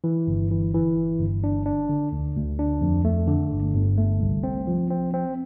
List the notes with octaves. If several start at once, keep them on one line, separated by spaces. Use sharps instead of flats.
E3
G1
E3
E3
G1
G1
D4
D4
D3
D2
D2
D4
F2
A3
D3
G1
G1
A3
C2
C4
F3
C4
C4